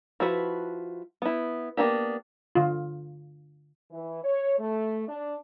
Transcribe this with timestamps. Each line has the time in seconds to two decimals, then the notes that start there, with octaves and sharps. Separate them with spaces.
0.20 F3 E4 F#4 B4
1.22 B3 E4
1.77 A#3 B3 D4 G4
2.55 D3 F4
3.91 E3
4.24 C#5
4.58 A3
5.09 D4